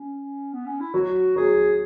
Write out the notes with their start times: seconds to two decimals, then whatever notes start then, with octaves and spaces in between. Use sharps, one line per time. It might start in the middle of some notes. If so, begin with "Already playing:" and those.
Already playing: C#4
0.53 B3
0.66 C#4
0.80 E4
0.94 F#3 F#4
1.36 F#3 G#4